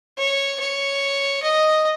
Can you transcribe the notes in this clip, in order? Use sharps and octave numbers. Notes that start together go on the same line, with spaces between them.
C#5
C#5
D#5